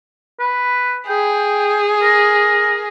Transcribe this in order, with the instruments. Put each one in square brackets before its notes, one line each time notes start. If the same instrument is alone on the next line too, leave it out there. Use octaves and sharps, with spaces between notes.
[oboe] B4
[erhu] G#4 [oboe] G5
[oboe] A#4